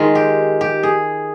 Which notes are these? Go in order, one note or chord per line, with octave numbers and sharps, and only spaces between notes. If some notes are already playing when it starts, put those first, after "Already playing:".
Already playing: D#3 G#3 F4
G4
G4
G#4